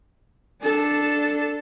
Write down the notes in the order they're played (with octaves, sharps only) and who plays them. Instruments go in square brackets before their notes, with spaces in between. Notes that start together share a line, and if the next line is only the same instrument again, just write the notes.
[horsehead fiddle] D4 A4